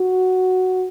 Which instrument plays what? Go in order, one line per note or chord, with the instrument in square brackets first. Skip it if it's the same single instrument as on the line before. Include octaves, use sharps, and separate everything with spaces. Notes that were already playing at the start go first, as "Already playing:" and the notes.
Already playing: [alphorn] F#4